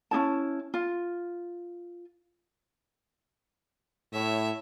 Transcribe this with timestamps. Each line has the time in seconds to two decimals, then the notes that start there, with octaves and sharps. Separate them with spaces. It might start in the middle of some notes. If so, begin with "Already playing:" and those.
0.11 C#4 D#4 E4 A5
0.74 F4
4.13 A2 C#5 E5